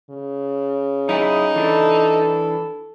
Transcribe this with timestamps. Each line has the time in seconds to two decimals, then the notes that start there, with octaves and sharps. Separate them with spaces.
0.10 C#3
1.09 F#2 D#4 E4 G#4
1.56 E3 D4 E4 A4